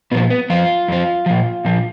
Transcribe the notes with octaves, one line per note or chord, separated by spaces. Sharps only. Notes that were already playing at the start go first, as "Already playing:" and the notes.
A#2 F3 B3
B3
F2 F3 F4
F2 F3
A#2 F3
A#2 F3